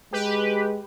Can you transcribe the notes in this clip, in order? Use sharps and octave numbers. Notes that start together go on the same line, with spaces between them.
G#3 G4 B4